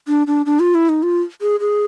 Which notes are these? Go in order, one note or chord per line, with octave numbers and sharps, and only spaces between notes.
D4
D4
D4
F4
E4
D#4
F4
G#4
G#4